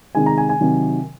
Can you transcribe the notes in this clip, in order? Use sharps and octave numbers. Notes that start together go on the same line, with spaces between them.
C3 D#3 G#3 G#5
A#5
G#5
G#5
C3 D#3 F#3